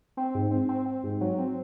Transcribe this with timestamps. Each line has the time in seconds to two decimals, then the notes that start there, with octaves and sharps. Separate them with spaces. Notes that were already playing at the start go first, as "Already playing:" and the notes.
0.17 C4
0.35 G#2
0.51 C4
0.69 C4
0.86 C4
1.04 G#2
1.21 F#3
1.38 C4